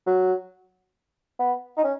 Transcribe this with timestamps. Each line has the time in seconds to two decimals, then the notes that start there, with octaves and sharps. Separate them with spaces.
0.07 F#3
1.39 B3
1.77 D#4
1.84 C#4